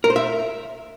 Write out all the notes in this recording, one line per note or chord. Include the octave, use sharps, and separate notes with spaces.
A#4
C5
E5